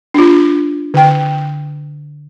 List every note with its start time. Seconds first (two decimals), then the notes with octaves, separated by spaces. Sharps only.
0.14 D4 F4
0.94 D3 G5